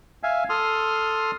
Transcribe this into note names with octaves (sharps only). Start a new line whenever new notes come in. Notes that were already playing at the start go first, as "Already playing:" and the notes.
E5 F5 G#5
A4 C6 D#6 F6